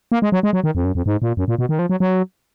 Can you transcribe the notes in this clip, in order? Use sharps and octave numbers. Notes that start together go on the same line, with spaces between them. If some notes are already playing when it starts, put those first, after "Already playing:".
A#3
G#3
F#3
G#3
F#3
D#3
F2
F#2
F2
G#2
A#2
F#2
A#2
B2
D#3
F3
F#3
F#3